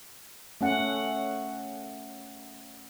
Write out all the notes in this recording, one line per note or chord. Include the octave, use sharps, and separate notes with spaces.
A3 C#4 F#5